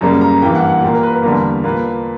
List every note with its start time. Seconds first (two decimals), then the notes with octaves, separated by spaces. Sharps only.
0.01 F#2 C#3 G3 A#3 A#5
0.21 A#5
0.42 G2 E3 A#3 G5
0.55 F#5
0.69 F#5
0.82 A#2 G4
0.87 A#3
0.93 A#4
1.03 B4
1.13 A#4
1.23 E2 D3 G3 A#3 A#4
1.64 A#2 A#3 B4